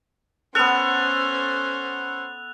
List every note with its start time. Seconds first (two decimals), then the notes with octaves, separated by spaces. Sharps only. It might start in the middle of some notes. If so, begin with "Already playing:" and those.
0.55 B3 C#4 A4 C5 F#6 F7